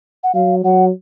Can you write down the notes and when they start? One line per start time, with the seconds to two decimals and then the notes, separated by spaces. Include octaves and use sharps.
0.24 F#5
0.34 F#3 F5
0.64 F#3 F#5